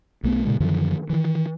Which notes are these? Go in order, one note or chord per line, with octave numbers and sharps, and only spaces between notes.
B1 A3 B3
A#2 C#3 G#3
F#2 D3 D#3 F3
D#3 E3